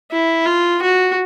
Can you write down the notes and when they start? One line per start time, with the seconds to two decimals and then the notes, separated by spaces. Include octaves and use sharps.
0.11 E4
0.46 F4
0.82 F#4